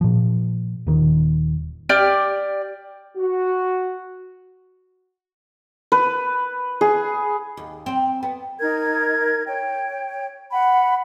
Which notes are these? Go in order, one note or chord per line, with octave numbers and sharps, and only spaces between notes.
A#2 F3
D#1 D#3
G4 D5 F6
F#4
B4
G#4
D#2
C4
B3
D#4 A#4 G#6
C#5 G5
F#5 B5